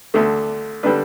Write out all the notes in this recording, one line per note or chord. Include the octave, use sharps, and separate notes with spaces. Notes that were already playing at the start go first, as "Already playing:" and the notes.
D2 D3 A3
D3 G3 D4 B4